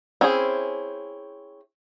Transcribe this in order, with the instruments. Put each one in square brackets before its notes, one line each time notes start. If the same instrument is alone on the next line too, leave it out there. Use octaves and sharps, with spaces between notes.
[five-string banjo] C4 C#4 E4 G#4